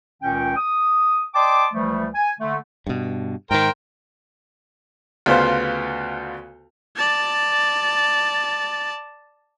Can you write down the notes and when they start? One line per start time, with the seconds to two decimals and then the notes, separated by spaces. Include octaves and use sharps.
0.22 C#2 A#2 D#3 C#4 G5
0.56 D#6
1.34 D5 D#5 G5 A5 C6 D6
1.73 C#2 E3 F3 G3 A3
2.15 G#5
2.40 D3 A3
2.87 G2 B2
3.51 G#2 D#3 A#4 C5 G5
5.26 D2 C#3 B3 F4 C5
6.97 D5 A5